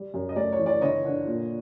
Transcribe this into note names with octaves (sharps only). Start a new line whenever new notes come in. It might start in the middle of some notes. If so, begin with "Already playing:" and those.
Already playing: G3
F#2
D#5
A3 D5
C#5
E3
D5
G1 C#5 D#5
D3
A#2